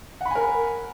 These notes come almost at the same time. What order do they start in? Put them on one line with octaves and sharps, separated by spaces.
F#5 B5 G#5 A#4